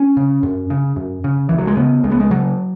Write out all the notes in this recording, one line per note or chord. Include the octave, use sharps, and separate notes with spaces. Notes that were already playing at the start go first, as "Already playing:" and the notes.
Already playing: C#4
C#3
F#2
C#3
F#2
C#3
C#2 E3
F#3
G#3
C#3 B3
C#2 G#3
B3
G#3
C#3 F#3